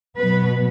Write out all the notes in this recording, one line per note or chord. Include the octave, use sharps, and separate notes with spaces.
B2 F#3 B3 B4